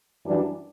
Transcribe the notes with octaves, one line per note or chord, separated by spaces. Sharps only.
F#2 E3 G3 D4 F#4